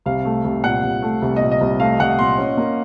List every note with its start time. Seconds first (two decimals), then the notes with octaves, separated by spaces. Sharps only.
0.06 C2 F5
0.25 A3
0.44 C2
0.64 A#2 F#5
0.83 C2
1.02 A3
1.22 C2
1.36 A#2 D#5
1.52 D#5
1.61 C2
1.80 A3 F5
2.00 C2 F#5
2.19 A#2 C6
2.38 C#4
2.57 A#3